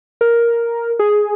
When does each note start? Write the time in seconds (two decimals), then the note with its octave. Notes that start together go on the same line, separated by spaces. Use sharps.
0.21 A#4
0.99 G#4